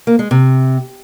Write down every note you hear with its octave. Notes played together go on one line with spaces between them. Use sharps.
A#3
G#3
C3